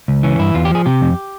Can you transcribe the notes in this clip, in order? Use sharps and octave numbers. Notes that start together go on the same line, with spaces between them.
C#2
E3 C#4
G2 E4
E2 F4
G4
F3 G#4
C3 G4
F2